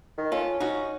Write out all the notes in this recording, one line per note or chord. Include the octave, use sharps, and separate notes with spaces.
D#3
C#4 F4 A4
D#4 F#4